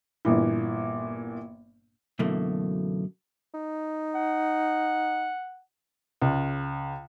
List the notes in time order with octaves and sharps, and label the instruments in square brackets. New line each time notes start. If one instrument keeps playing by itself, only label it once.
[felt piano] G1 A#2 E3
[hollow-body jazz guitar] F#2 B2 D3 E3 A3 A#3
[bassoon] D#4
[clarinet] F#5
[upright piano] C#2